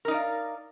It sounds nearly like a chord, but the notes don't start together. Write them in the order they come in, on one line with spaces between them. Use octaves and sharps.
A#4 D#4 D5 F5